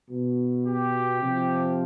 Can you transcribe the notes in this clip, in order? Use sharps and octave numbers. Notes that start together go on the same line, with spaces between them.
B2
G4
C3 F3